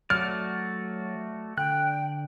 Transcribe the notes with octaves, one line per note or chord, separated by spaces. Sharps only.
F#3 A3 F#4 D5 F6
D3 G5 F#6